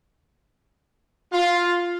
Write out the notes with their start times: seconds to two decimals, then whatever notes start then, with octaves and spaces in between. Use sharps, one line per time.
1.33 F4